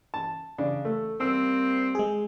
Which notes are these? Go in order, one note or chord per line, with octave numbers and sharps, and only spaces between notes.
A5
C#3 D4
A3
G3 A#3 C4 E6
G#3 G#4